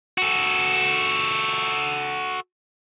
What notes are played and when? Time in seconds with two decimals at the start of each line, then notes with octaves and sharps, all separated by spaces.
0.18 F#4 A4